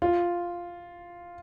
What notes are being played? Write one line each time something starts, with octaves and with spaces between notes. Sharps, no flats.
F4